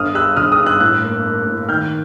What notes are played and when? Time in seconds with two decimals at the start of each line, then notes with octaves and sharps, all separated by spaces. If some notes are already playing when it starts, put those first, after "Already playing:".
Already playing: G1 D#6 F6
0.15 G3 E6 F#6
0.36 G1 D#6 F6
0.52 D#6 F6
0.59 G2
0.66 E6 F#6
0.80 A2 E6 F#6
1.04 A#3
1.25 A#3
1.47 A2
1.69 D#3 F6 G6